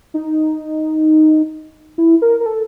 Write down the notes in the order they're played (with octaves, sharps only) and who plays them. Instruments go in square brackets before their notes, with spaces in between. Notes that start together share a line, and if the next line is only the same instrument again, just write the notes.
[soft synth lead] D#4
E4
A#4
A#4
A4